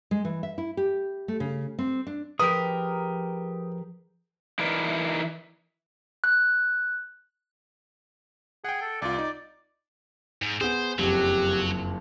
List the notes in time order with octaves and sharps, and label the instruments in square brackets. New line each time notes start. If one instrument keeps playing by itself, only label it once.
[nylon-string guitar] G#3
E3
E5
E4
G4
A3
C#3
C4
D4
[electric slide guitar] F3 G#4 [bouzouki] G4 A#4 [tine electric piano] B4 [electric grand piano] D#6
[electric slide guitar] E3 D#4 E4 A#4 B4 D5
[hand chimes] F#6
[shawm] G#4 [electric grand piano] F#5 G5
[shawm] A4
[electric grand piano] C2 F4 [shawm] D5
[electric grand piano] D#4
[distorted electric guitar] G#2
[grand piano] B3 G#4 [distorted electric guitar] C5
[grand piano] F#1 F2 [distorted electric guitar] F#3 [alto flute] G4